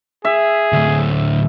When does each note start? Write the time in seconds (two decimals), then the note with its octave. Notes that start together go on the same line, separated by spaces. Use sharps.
0.25 G#4 E5
0.73 D2 A2